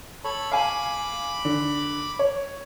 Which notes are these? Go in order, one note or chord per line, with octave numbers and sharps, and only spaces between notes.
A4 C#5 B5
F5 G#5 B5 D6
D3
C#5